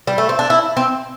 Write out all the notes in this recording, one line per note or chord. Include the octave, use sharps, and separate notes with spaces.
G3
A3
C4
D4
E4
C4